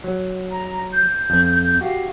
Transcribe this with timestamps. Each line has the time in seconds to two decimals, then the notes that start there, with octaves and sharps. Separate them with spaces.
0.04 F#3
0.50 A#5
0.92 G6
1.30 F2
1.81 F#4 G4 F5